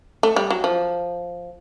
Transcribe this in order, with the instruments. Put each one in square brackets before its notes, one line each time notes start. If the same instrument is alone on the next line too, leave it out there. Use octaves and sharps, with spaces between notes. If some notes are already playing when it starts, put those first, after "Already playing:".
[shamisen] A3
G3
F#3
F3